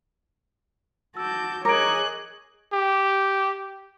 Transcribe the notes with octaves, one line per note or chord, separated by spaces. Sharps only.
F#4 A5 D6 E6 G6
G#4 A#4 C#5 D#5 G#5 D6 F#6 D7
G4